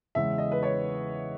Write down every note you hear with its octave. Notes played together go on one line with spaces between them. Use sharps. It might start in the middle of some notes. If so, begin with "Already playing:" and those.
E2 C#3 G#3 E5
D#5
B4
C#5